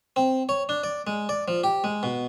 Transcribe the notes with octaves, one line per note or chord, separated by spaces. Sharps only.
C4
C#5
D4
D5
G#3
D5
F3
G4
G#3
B2